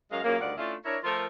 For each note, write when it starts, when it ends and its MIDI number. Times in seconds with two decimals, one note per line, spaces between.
0.12 0.20 42
0.12 0.20 56
0.12 0.20 70
0.12 0.20 77
0.24 0.35 42
0.24 0.35 46
0.24 0.35 49
0.24 0.35 58
0.39 0.52 38
0.39 0.52 43
0.39 0.52 51
0.39 0.52 65
0.39 0.52 74
0.39 0.52 78
0.57 0.74 57
0.57 0.74 61
0.57 0.74 62
0.57 0.74 64
0.57 0.74 65
0.85 0.98 62
0.85 0.98 64
0.85 0.98 70
0.85 0.98 73
1.04 1.25 53
1.04 1.25 57
1.04 1.25 65
1.04 1.25 69
1.04 1.25 70